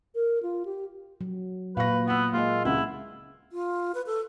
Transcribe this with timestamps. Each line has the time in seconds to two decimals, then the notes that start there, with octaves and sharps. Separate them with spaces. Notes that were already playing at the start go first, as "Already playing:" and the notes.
0.15 A#4
0.43 F4
0.65 G4
1.21 F#3
1.77 A#2 B4 F5 C#6 A#6
2.07 B3 F#5 E6
2.33 G#3 A#3 F4 G#4 D#5
2.65 C#2 C#3 E4 F#5
3.52 F4
3.94 B4
4.07 A4